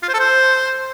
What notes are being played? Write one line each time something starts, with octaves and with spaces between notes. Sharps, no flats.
F4
C5
A4
C5